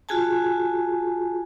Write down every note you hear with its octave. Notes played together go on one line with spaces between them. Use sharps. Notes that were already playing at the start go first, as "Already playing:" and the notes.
F4 F#4 G#4 G#5 A5